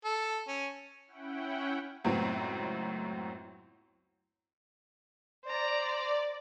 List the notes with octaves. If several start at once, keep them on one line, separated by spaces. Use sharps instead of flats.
A4
C#4
C#4 E4 F#5 G5
C#2 F#2 A2 B3 C4
C5 D5 A#5